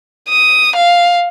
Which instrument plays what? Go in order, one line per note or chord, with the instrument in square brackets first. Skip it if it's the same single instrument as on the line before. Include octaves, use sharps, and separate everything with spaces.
[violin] D#6
F5